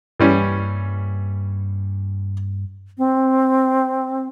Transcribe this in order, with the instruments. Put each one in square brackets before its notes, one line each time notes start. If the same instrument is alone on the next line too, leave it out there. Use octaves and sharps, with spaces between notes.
[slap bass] G2 A#3 [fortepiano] E3 G3 C#4
[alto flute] C4